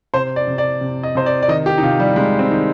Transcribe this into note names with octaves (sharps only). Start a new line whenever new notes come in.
C3 C5
D5
C3
D5
C3
D#5
C3 C5
D5
D5
D#3 D#5
G4
D#4
C3 F4
G3
C3 G#3
C4
D#3 D#4